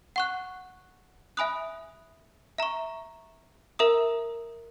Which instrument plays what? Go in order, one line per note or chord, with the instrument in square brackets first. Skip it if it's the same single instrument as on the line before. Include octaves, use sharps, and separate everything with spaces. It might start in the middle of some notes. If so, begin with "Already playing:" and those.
[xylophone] F#5 C#6 F#6
E5 G#5 B5 D#6 F#6
E5 A#5 C#6
A#4 E5 A#5 D#6